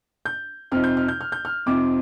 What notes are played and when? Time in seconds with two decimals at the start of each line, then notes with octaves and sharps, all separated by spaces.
0.25 G6
0.72 F2 C3 F3 C4 D#4 F6
0.84 G6
0.97 F6
1.08 G6
1.21 F6
1.32 G6
1.45 F6
1.66 F2 C3 F3 C4 D#4 D6